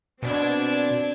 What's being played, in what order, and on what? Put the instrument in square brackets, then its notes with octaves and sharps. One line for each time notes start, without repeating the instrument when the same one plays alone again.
[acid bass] B2 [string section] C4 D4 G#6